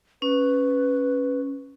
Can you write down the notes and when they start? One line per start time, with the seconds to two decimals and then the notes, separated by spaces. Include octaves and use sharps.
0.22 C#4 B4